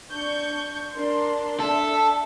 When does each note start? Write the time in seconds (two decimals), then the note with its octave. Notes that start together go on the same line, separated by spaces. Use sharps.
0.11 D4 C#6 G6
0.93 D4 A#4 C6
1.60 D4 A4 E5